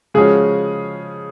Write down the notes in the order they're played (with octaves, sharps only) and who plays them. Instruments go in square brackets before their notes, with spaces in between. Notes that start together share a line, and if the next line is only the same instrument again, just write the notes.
[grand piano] C#3 F3 G#3 C#4 F#4 [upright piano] G#4